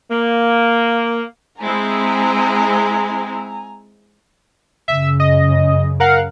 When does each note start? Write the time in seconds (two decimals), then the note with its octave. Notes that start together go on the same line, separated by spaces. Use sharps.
0.10 A#3
1.62 G#3 C4 E4 G#5 A#5
4.88 F#2 C#3 E5
5.20 D#5
6.00 A#4 F5 F#5